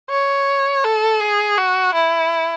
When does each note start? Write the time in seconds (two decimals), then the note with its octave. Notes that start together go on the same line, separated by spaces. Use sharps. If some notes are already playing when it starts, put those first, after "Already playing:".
0.10 C#5
0.84 A4
1.21 G#4
1.58 F#4
1.94 E4